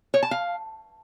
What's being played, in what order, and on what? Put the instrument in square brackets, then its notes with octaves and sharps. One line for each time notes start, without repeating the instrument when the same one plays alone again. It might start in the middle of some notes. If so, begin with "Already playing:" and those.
[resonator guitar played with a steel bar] C#5
A5
F5